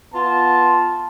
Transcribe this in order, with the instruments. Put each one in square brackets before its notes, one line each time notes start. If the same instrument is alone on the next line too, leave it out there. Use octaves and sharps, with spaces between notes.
[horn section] B3 F4 A5